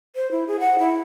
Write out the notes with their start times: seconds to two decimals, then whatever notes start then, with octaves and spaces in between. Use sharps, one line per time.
0.16 C5
0.31 E4
0.48 G#4
0.60 F#5
0.79 E4